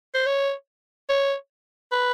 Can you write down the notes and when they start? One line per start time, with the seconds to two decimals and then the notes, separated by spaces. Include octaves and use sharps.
0.14 C5
0.26 C#5
1.09 C#5
1.92 B4